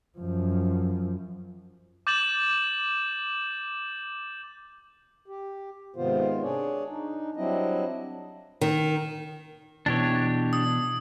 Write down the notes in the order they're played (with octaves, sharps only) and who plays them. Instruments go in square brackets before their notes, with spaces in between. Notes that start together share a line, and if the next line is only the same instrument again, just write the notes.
[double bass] F#2 F3
[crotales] D6 G6 A6 E7 F#7
[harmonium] G4
G#2 C3 D#3 B3 F4 C5
D4 G#4 C#5 D5
D4 D#4
F#3 G3 C4 D4 E4 D#5
[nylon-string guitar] D#3
[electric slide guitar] B2 E3 [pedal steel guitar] D4 G4 C#5
[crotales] D#6